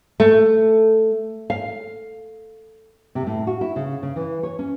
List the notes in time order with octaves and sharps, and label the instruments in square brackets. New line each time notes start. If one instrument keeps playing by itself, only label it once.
[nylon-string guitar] A3
F5
C3
A2
F#4
E4
C#3
C#3
E3
C#5
C#4